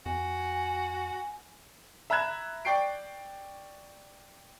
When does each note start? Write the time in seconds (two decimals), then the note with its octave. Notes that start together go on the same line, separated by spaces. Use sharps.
0.06 F2 F#4 G#5
2.10 E5 A#5 B5 F#6 G#6 E7
2.65 D5 G5 C#6 C7 D7